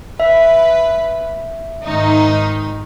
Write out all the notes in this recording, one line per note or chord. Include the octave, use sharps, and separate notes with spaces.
B4 E5
G#2 D#3 D#4